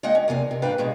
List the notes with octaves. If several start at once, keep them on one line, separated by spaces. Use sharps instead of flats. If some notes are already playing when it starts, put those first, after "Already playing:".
G#3 A#3 D#5 F#5 G5
C#4
E2 C3 A#3 G#5
C3
G#2 D4 B4 F5 G5
G2 B2 G#3